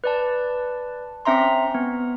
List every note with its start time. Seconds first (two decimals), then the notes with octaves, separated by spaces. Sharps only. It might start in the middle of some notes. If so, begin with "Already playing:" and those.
0.04 B4 D5 A5
1.25 C4 C#4 E5 A#5 C6
1.74 B3